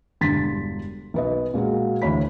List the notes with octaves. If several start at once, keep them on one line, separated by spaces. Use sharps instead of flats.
E1 G2 D3 C6 A6 B6
B1 B4 D#5
A#2 G#3 A#3 F#4
D2 E3 C#5 B5 B6